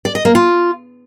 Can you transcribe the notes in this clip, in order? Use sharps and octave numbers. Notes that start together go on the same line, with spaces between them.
D5
D#5
A#3
F4